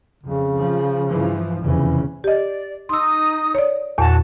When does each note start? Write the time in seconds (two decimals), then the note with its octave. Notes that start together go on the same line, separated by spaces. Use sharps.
0.23 F2 C#3
0.56 F3
1.08 G2 E3 F3
1.61 F1 E2 C#3 E3
2.24 G4 D5 D#5
2.89 D#4 C6 D#6 E6
3.55 C#5 D5
3.98 E2 A#2 F#4 A5